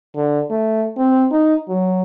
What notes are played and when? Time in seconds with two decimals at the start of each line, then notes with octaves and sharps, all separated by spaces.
0.16 D3
0.50 A3
0.97 C4
1.32 D#4
1.69 F#3